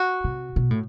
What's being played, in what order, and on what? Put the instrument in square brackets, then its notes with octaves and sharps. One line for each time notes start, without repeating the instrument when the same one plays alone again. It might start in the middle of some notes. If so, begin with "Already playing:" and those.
Already playing: [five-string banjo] F#4
[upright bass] C3
B2
A2